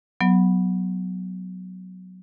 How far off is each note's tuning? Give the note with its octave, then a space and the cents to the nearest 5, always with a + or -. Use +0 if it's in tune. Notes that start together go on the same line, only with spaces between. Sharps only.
F#3 +0 B3 +0